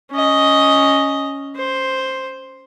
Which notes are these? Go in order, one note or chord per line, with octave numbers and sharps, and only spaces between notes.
C#4 D#5
C5